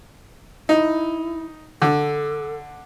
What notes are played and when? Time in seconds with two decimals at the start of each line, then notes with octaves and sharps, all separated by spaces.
0.69 D#4 E4
1.82 D3 A4